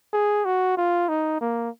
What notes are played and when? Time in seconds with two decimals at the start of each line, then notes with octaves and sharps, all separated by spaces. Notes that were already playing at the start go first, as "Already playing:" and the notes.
0.13 G#4
0.45 F#4
0.77 F4
1.09 D#4
1.41 A#3